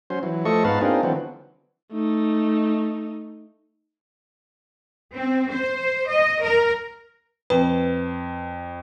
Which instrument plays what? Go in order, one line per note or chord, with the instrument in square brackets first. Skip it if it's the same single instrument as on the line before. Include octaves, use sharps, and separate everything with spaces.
[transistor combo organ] F#3 C#4 C5
E3 F#3
F3 A3 A4 D#5 C#6
G#2 B3 D#4 B4 F5 A5
A#3 C4 D4 D#4 F4 G#4
D3 E3 F#3 B3 C4
[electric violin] A3 D#4
[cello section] C4
C5
D#5
A#4
[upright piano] F2 [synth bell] B4